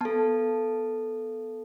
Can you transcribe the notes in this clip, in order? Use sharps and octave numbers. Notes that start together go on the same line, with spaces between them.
B3 A4 A5